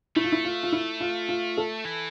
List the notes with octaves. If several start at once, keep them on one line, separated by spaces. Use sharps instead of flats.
A3 E4
F4
E4
F4
F4
E4
F4
F4
A4
E3